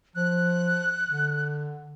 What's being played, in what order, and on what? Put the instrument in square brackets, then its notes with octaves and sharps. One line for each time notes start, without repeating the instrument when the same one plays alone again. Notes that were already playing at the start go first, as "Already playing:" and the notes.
[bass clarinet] F3 [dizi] F#6
[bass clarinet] D3